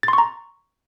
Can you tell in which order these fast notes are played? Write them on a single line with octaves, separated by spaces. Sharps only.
A6 C6 C#6 A#5